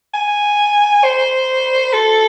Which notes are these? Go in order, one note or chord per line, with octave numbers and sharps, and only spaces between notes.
G#5
C5
A4